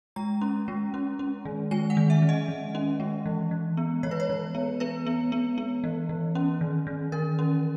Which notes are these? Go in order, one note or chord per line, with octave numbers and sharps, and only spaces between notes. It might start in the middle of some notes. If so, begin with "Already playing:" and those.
G#3 A#5
C#4
G#3
C#4
C#4
D#3
G#3 G#5
F#5
D#3
E5
D#3
D#5
D#3
C#4
G#3
E3
E3
B3
E3 C#5
B4
C#5
E3
B3
B3 B4
B3
B3
B3
E3
E3
C#4
D#3
D#3
D#3 A#4
C#4